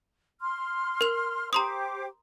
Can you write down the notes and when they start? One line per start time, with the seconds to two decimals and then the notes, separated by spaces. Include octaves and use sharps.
0.40 C6 F6
1.01 A#4 F7
1.53 G4 C5 A#5 C6 D6 D#6